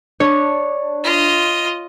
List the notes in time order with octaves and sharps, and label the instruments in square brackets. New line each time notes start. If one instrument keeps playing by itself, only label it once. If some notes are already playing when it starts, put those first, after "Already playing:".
[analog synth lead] D4 [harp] C#5
[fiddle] F4 D#5